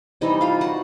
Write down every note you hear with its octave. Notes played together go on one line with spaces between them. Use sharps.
C3 E3 G3 C4 D#4 D#5
F4 F5
F#4 F#5